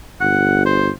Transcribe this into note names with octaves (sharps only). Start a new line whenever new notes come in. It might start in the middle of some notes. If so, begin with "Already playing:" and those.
G1 F#5
C5